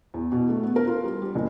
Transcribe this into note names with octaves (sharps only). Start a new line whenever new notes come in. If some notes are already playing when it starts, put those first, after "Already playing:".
E2
B2
A3
B3
A#4
F4
G3
G3
F#1